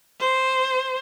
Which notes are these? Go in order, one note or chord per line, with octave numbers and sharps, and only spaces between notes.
C5